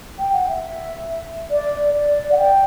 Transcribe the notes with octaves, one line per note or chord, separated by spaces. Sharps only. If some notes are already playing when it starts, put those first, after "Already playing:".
G5
F#5
E5
D5
D5
F#5
G5